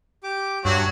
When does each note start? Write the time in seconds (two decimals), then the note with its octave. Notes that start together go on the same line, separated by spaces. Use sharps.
0.23 G4 D6
0.65 G2 F#3 F#4 C#5